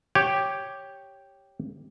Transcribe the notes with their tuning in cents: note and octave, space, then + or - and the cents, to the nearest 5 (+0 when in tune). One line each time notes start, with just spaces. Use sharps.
G4 +0 C#5 +0